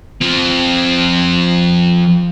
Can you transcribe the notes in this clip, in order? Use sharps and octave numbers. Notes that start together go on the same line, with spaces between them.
F3 C4